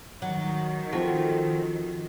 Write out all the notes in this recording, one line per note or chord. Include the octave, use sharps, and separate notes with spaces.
D#3 F#3
F3 A3 C4 F#4